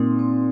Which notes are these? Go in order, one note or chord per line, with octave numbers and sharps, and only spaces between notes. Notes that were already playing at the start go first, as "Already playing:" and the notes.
Already playing: A#2 C4 D#4
C4